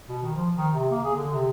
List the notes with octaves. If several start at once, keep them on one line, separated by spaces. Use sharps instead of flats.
B2
D#3
F3
D#3
C3
A#3
G#4
D3
C3